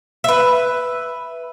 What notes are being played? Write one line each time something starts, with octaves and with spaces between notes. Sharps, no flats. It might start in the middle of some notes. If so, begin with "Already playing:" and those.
B4 E5